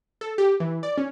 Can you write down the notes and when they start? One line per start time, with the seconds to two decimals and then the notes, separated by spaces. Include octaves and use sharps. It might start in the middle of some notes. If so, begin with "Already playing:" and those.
0.21 A4
0.38 G4
0.60 E3
0.83 D5
0.98 C#4